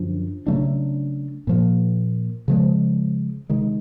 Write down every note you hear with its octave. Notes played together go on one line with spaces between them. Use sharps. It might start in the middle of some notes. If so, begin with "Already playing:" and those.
Already playing: F#2 D3 F3
C#3 F#3 A3 D4
A#2 F3 A#3
C#3 F3 G#3
C3 D#3 G#3